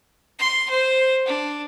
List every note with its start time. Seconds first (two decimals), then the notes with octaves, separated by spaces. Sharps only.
0.39 C6
0.70 C5
1.26 D4